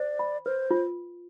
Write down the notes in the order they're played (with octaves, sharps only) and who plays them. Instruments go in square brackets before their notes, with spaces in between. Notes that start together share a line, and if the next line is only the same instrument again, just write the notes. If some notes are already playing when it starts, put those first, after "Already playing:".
Already playing: [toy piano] C5 [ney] D5
[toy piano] B5
[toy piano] B4 [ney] C5
[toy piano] F4